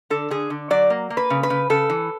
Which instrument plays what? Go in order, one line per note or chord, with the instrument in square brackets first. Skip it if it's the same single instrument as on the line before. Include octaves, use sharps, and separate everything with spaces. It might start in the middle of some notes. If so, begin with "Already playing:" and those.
[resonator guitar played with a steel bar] D3 A4
D3 G#4
D3
F#3 D5
A#3
A#3
B4
C#3
B4
C#3
C#3 A4
E3